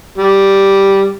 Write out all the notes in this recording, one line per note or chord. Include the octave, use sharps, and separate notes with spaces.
G3